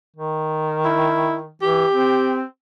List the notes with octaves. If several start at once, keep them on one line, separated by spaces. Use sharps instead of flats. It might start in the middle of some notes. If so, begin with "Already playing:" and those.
D#3
E4
E3 G4
C4